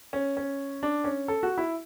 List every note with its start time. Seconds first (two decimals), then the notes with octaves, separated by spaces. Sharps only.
0.13 C#4
0.37 C#4
0.83 D4
1.04 C#4
1.28 A4
1.43 F#4
1.58 E4